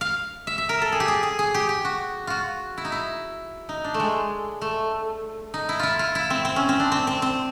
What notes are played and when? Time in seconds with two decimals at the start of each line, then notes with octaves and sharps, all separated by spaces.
0.01 F5
0.47 E5
0.58 E5
0.69 A#4
0.82 A4
0.92 G#4
1.00 G4
1.08 G#4
1.23 G#4
1.39 G#4
1.54 G4
1.69 G4
1.85 F#4
2.27 F4 F#4
2.77 E4
2.85 D#4
2.92 E4
3.69 D#4
3.84 D4
3.94 A3
4.00 G#3
4.62 A3
5.54 D#4
5.69 E4
5.79 E4 F4
5.99 F4
6.15 E4
6.30 C4
6.45 C4
6.56 C#4
6.69 C4
6.80 D4
6.92 C4
7.07 C4
7.22 C4